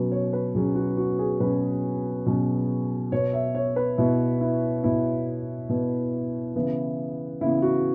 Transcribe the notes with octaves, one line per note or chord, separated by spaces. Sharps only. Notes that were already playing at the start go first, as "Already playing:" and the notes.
Already playing: B2 F#3 C#4 B4
C#5
B4
B2 F#3 C#4 G#4
F#4
F#4
G#4
B2 F#3 C#4 B4
B2 F#3 C#4
B2 B3 C#5
E5
C#5
B4
B2 B3 E4
E4
B2 B3 E4
B2 B3
C#3 E3 B3
C#3 E3 B3 E4
F#4